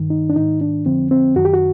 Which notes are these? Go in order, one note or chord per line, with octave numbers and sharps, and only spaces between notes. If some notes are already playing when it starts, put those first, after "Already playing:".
Already playing: G2 D#3
D#4
D4
G#2 D#3 D#4
D4
F2 D3 F3 C4
C4
F#2 D#3 F#4
G4
F#4